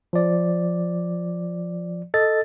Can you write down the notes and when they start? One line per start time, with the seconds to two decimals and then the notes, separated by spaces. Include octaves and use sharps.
0.13 F3 D5
2.14 A4 D#5 A6